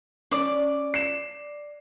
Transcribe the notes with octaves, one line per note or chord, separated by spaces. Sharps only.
C#4 D5 D6
C7 E7